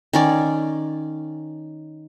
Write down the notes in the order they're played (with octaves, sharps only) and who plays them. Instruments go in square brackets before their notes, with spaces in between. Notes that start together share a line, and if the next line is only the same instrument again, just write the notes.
[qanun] D#3 C#4 D5